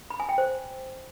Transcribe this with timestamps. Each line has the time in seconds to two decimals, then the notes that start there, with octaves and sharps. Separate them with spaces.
0.10 B5
0.20 G#5
0.29 G5
0.38 C5